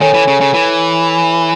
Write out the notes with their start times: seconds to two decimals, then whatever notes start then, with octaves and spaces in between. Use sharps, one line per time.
0.01 D#3 A4 C#5 G#5
0.14 E3
0.28 C#3
0.41 C#3
0.54 E3